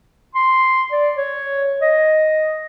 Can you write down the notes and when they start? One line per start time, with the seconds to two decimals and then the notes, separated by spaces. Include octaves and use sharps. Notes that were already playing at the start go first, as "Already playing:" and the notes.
0.35 C6
0.92 D5
1.17 C#5
1.81 D#5